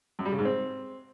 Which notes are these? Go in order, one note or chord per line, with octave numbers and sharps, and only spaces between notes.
F#2
G3
C#3
G#2
C4